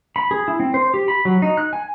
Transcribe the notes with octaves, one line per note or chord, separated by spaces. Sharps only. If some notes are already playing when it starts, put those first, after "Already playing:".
B5
G#4
E4
C4
C5
G4
B5
F#3
D#4
F#6
G#5